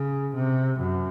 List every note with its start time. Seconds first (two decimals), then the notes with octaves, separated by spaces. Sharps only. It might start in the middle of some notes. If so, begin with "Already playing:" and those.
Already playing: C#3
0.35 C3
0.80 F#2